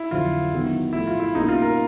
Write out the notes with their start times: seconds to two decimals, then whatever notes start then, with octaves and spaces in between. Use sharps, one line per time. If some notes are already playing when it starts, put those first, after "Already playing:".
Already playing: E4
0.11 F2 D3 F#3 F4
0.53 D#3 F#3 B3 E4
0.93 A2 F3 A3 E4
1.07 F4
1.20 E4
1.34 B2 G3 A#3 C#4 D#4 E4
1.48 F4
1.62 A#4